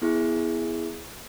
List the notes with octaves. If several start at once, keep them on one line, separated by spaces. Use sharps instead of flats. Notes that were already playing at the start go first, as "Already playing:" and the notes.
B3 E4 G#4